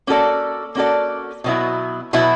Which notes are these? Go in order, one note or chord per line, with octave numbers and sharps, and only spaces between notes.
A#3 C#4 F#4 A4 D5
A#3 C#4 F#4 A4 D5
B2 F#3 B3 E4
B2 F#3 B3 E4